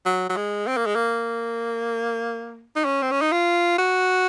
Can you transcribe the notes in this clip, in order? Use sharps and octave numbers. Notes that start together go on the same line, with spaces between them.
F#3
F#3
G#3
C4
A#3
G#3
A#3
D#4
C#4
C4
C#4
D#4
F4
F#4